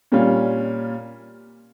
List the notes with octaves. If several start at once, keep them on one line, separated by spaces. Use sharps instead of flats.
A#2 G3 C#4 F4